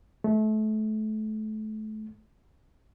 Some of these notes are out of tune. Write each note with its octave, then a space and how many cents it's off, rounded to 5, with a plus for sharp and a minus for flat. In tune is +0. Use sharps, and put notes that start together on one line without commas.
A3 -30